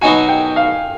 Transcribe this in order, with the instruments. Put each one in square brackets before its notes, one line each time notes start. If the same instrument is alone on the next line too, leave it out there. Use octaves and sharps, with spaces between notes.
[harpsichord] B2 F#3 B3 D#4 F#4 [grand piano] G#5
[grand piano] G5
F5